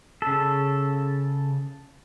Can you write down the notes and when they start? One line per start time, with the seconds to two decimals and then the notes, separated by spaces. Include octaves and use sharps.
0.22 C#3 A4